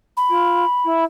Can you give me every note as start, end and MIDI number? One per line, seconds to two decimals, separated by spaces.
0.17 1.04 83
0.30 0.65 65
0.85 1.05 64